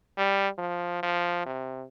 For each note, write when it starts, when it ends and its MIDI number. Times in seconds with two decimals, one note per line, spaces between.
0.18 0.48 55
0.58 0.98 53
1.03 1.45 53
1.46 1.85 48